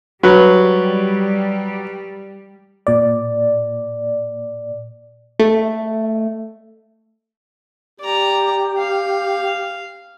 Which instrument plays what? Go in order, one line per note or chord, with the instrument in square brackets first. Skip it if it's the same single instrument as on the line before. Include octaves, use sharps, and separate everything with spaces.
[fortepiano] F#3 B4 [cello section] G3
[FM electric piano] A#2 D5
[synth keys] A3
[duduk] G4 [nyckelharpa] D5 A#5
[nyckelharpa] F5